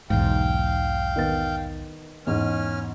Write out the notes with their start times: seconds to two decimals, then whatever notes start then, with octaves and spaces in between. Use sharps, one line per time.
0.10 B1 E2 G#2 F5 G5
1.16 D#3 B3 A6
2.27 E2 G#2 C#4 F6